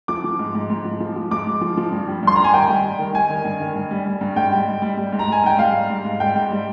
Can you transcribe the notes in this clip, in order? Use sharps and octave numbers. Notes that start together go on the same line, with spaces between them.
F3 D6
F3
G#2
G#2
G#2
F3
F3
F3
G#2 D6
G#2
F3
F3
G2
G3
G2 C6
G3 A#5
G#5
D#3 G5
G3
G3
D#3
G3 G#5
D#3
G2
D#3
G2
G3
G3
G2
G#2 G5
G3
G#2
G3
G3
G#2
A#5
G3 G#5
G#2 G5
G3 F5
G3
G#2
G#2
G3 G5
G#2
G3